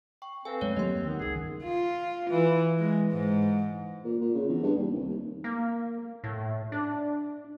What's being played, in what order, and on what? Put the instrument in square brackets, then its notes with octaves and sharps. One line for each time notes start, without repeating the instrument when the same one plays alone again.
[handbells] G5 C#6
[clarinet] C4 [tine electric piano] A4 B4 [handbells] F5 G#5
[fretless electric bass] F#2 G#3 A3 [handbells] C#5 D5
[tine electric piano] D#2 [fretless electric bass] F#3 [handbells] D#5 C6
[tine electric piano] D#3 [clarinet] B3
[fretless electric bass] G1 C#2 [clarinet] G#4
[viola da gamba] F4
E3
G#3
G#2
[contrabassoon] A#2
A#2
C#3
E2
G2
D#2
C2
D#2
[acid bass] A#3
A2
D4